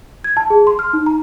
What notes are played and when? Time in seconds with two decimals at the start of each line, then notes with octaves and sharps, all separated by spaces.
0.24 G#6
0.37 A5
0.50 G#4
0.67 C6
0.79 F6
0.93 D#4
1.06 A#5